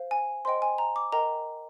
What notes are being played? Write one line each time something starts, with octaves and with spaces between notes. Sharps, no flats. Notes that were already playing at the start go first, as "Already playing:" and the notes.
Already playing: C5 F5
G#5
C5 D#5 G5 C6
G#5
A#5
D6
A#4 D#5 G5 A#5